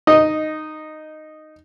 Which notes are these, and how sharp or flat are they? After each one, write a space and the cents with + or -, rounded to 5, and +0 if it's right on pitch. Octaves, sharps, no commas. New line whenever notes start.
D#4 -10 D#5 +0